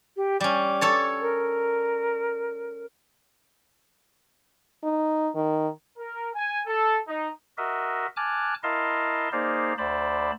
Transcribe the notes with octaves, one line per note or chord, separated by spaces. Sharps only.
G4
G3 C#4 D6
A4 C#5 A5
A#4
D#4
D#3
A#4
G#5
A4
D#4
F#4 A#4 D#5 E5
G#5 A5 D6 F6 F#6
E4 A#4 D#5 F5 A5 C6
A#3 D#4 G#4 C5 D5 F5
D2 C5 D5 A5 B5